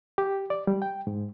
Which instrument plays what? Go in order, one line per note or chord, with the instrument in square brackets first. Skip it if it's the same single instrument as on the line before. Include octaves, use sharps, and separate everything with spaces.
[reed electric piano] G4
D5
G3
G5
G#2